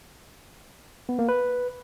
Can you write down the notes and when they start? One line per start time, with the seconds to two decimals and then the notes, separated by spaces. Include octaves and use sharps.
1.09 B3
1.19 A#3
1.29 B4